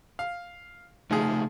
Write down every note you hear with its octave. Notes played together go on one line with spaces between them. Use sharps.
F5
C#3 F3 A3 D#4 G#4